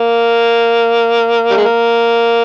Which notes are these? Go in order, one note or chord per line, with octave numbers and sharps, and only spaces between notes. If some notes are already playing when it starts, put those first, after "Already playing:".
Already playing: A#3
G3
G#3
A#3